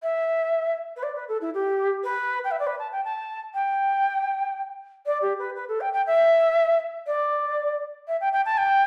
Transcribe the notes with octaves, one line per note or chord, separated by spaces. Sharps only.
E5
B4
D5
B4
A4
E4
G4
B4
G5
E5
D5
B4
A5
G5
A5
G5
D5
G4
B4
B4
A4
G5
G5
E5
D5
E5
G5
G5
A5
G5